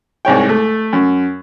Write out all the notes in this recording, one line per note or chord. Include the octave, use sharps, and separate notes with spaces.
C2 G#2 C#5 G5
A3
F#2